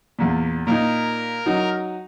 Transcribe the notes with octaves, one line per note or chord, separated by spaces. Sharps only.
E2 A#2
A#2 D#4 A#4
F#3 D#4